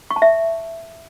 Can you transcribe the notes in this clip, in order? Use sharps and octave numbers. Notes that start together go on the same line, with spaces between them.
C#6
A5
E5